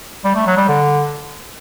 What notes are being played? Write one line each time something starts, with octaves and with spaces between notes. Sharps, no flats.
G3
A3
F#3
G3
D3